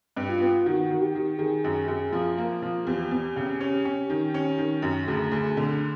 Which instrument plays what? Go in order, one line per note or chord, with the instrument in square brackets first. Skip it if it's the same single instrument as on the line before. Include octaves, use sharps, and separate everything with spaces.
[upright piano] G2
[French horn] F4
[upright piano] B3
[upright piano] D#3 [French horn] F#4
[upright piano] D#3
[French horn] G4
[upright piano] D#3
[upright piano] D#3 [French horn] G#4
[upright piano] F#2
F#2
F3
A#3
F3
[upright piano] E2 [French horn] G4
[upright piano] E2
C#3
C#4
C#4
D#3
C#4
D#3
F#2
[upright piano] D2 [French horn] G#4
[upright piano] D2
D3